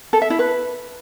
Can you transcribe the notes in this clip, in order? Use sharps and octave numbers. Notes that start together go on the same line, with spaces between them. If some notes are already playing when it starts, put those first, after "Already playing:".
A4
E5
E4
B4